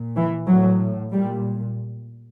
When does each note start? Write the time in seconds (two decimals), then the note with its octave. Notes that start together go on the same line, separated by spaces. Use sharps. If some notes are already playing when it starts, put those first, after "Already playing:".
Already playing: A#2
0.16 E3
0.47 A2 F#3
1.11 A#2 G3